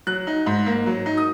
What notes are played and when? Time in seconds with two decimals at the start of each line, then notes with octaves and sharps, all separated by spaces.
0.07 F#3 F#6
0.27 D#4
0.46 G#2
0.66 A#3
0.86 F#3
1.06 D#4
1.17 D#6